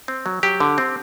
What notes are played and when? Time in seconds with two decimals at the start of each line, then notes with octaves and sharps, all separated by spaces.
0.08 C4
0.26 F#3
0.43 F#3 G4
0.60 D3
0.78 C4